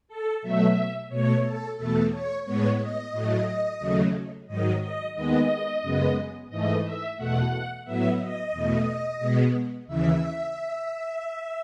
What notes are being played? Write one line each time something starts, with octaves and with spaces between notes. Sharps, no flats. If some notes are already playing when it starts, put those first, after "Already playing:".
A4
B2 F#3 A3 E5
B2 A3 C#5
A4
E2 B2 A3 A4
C#5
A2 G#3 B3 C#5
D#5
A2 F#3 A3
D#2 C#3 F#3 A3
G#2 D#3 F#3 D#5
D#5
D#2 D#3 G#3 B3 D#5
F#2 C#3 G#3 B3
G#2 E3 A3 D#5
E5
E2 B2 A3 F#5
A2 F#3 B3 E5
D#5
E2 B2 A3
B2 G#3 B3
D#2 C#3 E3 E5